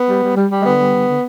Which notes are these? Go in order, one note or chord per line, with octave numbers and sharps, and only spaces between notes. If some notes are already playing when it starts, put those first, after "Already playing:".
Already playing: B3
G3
G3
G3
G3
G#3
D3 B3
G3
D3
D3